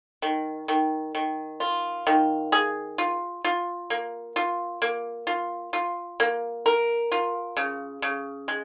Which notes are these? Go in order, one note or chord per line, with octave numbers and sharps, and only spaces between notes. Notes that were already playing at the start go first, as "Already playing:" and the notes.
D#3
D#3
D#3
F4
D#3
G#4
F4
F4
A#3
F4
A#3
F4
F4
A#3
A#4
F4
C#3
C#3
G#3